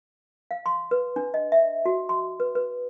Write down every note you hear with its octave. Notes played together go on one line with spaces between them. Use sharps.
F5
C6
B4
D4
D#5
E5
F#4
C6
B4
B4